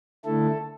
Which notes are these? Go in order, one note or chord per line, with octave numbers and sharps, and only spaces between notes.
D3 A3 E4 A4